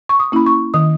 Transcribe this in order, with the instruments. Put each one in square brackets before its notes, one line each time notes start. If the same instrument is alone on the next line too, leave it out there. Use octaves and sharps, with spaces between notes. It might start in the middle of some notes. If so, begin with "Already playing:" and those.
[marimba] C#6
D#6
A#3 C#4 E4 B5
C#6
D#3 D#6